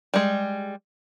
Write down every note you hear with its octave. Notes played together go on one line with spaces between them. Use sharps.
G3 G#3